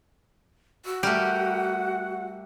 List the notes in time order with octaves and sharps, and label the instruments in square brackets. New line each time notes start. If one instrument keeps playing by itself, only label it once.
[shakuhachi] F#4 [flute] E6
[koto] G3 A3 [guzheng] G4 A#4 [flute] F#5